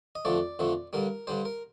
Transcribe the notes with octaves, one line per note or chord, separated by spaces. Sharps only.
D#5
F2 D3 F3 A3 D5
F2 D3 F3 A3
G2 D3 G3 A#4
G2 D3 G3 C5
A#4